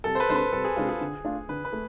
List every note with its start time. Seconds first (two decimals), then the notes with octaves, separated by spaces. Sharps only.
0.04 C2 A4
0.15 C5
0.20 B4
0.28 C3 G#3 D4 C5
0.36 B4
0.52 C2 A4
0.64 G#4
0.76 C3 G#3 D4 F4
0.88 G#4
1.00 D3
1.25 A3 D4 F4
1.49 D3 B4
1.65 B4
1.72 A3